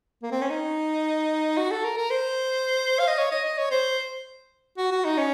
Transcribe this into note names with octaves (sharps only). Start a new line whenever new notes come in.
A#3
C4
C#4
D#4
F#4
A4
A#4
A#4
C5
F5
D#5
C#5
D#5
D#5
C#5
C5
F#4
F#4
D#4
C#4